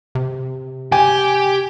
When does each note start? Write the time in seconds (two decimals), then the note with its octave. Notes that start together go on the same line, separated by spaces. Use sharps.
0.15 C3
0.92 G4 G#5